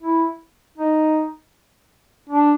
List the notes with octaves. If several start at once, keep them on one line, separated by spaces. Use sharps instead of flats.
E4
D#4
D4